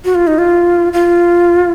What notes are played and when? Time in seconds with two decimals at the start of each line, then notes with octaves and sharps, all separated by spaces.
0.05 F#4
0.15 F4
0.27 D#4
0.38 F4
0.93 F4